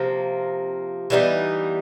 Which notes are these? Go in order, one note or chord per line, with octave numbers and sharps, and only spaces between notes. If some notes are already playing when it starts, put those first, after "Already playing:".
Already playing: C3 F3 A#3
E3 G3 B3 D#4